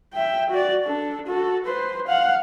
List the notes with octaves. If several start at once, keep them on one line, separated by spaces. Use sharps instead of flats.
E5 G5
F#4 D5
D4 A4
F#4 A4
B4 C5
F5 F#5